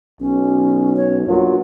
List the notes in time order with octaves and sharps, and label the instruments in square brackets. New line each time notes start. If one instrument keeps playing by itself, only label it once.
[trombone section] B1 [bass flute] C#4
[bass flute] C#5
[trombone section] G2 F#3 A#3 [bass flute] F4